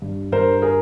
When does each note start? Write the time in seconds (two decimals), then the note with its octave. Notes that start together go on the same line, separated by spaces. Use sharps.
0.02 G2
0.32 G2 A#4 C5
0.62 G#4 A#4